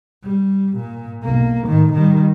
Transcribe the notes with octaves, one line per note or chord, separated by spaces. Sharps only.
G3
A#2
B1 A#3
A2 D#3
D#3 G3